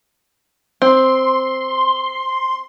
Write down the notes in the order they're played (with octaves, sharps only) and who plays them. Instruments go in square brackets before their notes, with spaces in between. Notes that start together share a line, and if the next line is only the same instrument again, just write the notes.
[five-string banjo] C4 [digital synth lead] C6